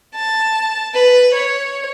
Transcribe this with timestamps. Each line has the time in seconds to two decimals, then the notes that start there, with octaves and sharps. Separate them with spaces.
0.15 A5
0.94 B4
1.35 C#5